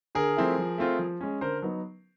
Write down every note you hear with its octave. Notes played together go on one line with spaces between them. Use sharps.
D3 G#4 A#4
F3 A3 C4 E4
F3
A3 C4 F4
F3
G#3 C#4
D3 A#4 C5
F#3 B3 D#4